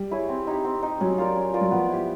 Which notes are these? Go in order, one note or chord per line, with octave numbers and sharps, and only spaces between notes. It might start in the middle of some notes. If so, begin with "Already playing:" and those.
Already playing: G3
E4 G#4 C#5
C4
D#4 G4
C4
D#4 G4
F#3 C#4
F4 A#4 D5
C#4
F4 A#4 D5
F#3
F3 B3
E4 G4